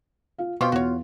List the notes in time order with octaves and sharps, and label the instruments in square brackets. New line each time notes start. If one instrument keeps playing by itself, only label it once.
[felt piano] F4 F5
[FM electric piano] B2 F4 [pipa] C4 G4 G5 [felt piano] C#6
[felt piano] E2 [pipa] F#4 C#5